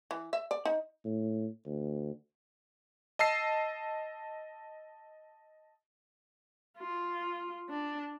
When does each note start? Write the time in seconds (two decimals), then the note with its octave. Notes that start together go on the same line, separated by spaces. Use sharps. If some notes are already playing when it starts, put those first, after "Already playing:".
0.11 E3
0.33 E5
0.51 D5
0.65 D#4
1.05 A2
1.66 D2
3.19 D#5 A5 E6 C7
6.78 F4
7.70 D4